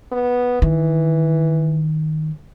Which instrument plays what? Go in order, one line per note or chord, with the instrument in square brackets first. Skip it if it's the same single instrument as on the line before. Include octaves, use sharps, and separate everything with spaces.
[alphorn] B3
[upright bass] D#3 [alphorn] E3